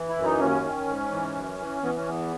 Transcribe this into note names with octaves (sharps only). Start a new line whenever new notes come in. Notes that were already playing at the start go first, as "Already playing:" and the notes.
Already playing: E3
E4
F#2
D#4
D#2 C#4
D#3
G#2
E3
F#2
E3
E3 B3
C#4
E2 B3